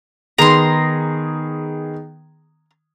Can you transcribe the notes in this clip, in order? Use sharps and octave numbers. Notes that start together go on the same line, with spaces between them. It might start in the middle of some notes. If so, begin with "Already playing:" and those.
D#3 B3 G#4 A#5 C6